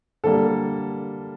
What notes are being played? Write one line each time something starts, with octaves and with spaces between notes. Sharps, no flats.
D3 G3 A#3 A4